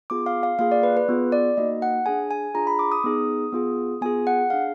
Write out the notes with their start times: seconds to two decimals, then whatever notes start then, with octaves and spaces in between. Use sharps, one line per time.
0.10 B3 F4 G#4 D6
0.26 F5
0.43 F5
0.59 A#3 F4 G#4 F5
0.71 D5
0.83 B4
0.97 B4
1.08 B3 F4 G#4
1.32 D5
1.57 A#3 D#4 F#4 D#5
1.82 F#5
2.06 D4 G#4 G#5
2.31 G#5
2.54 D4 F4 G#4 A#5
2.67 B5
2.79 D6
2.92 D#6
3.04 B3 D#4 G#4
3.52 B3 F4 G#4
4.01 B3 F4 G#4 G#5
4.27 F#5
4.50 D4 G#4 F5